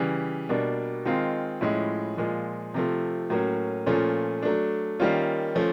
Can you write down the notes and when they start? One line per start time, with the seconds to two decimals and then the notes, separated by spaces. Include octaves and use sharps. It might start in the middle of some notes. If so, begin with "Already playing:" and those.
Already playing: C#3 E3 G3
0.49 B2 G3 A#3 D4
1.05 D#3 G#3 C4 F4
1.61 A2 F3 G#3 C#4 E4
2.17 A#2 F3 G#3
2.74 C3 F3 A3
3.30 A2 F#3 A#3 C#4
3.86 A#2 F3 A3 C#4
4.43 F#3 A3 D4
5.00 D#3 G3 A#3 C#4 F4
5.55 F3 A3 C#4